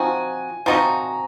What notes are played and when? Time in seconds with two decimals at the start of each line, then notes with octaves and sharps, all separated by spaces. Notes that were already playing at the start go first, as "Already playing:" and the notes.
Already playing: F3 C4 D#4 F#4 G#5
0.66 F3 C4 D#4 F#4 A#5